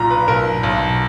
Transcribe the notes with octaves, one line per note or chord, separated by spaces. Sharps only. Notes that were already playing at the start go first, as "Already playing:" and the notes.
Already playing: B1 A#2 A#5
B4
B1 A#4
B1